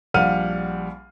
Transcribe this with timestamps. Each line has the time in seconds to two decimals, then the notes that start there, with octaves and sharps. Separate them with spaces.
0.14 A#1 G3 F5 F#5 F6 D#7